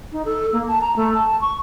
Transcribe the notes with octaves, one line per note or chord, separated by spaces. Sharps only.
D#4
A4
A#3
A5
A#5
A3
A5
C#6